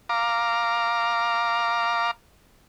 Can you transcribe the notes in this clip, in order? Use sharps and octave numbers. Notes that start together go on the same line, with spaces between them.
F5 A#5 D6